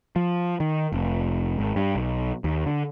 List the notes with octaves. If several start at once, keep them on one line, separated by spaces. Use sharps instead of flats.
F3
D#3
F1
G#1
G2
B1
D#2
D3